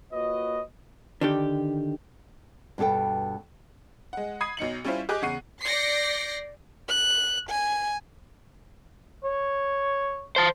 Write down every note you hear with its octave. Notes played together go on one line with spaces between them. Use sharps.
A#3 F4 F#4 B4 C#5 D#5
D3 D#3 G4
G2 B2 F#4 A4 G5
G#3 F#5
B5 D#6 G#6 C7 D#7
B1 D#4 C#7 F#7
G3 C#4 E4 F4 C5
G4 G#4 D#5 G#5 D6 F#6
E2 C#3 F#5 C#6 C7 D#7
D5 D6 G6 A#6 C7 C#7
F#6
G#5
C#5
C5 A5